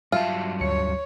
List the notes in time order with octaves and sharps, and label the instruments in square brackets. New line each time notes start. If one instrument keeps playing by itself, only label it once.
[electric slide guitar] G2 F#3 A5 [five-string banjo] F4 [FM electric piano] E5
[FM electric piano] D2 C#7 [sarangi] C#5